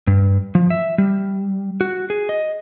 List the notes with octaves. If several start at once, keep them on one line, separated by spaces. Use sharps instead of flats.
G2
F3
E5
G3
F#4
G#4
D#5